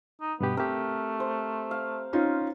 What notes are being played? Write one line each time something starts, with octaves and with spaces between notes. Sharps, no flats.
D#4
G2 B2 B3 G4
A3 C4 G4 A#4
C5
F5
C#4 D#4 F4